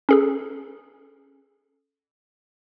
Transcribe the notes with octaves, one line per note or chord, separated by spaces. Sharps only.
C#4 G#4 A4